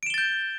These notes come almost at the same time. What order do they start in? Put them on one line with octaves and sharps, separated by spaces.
D7 E7 G7 A6 G6